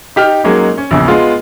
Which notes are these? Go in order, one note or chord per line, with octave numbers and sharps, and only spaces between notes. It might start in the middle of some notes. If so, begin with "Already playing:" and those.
D#4 G4 F6
F#3 G#3 A#3 C#4 D#4
C#4
A#1 E2 C#3
G#3 B3 F4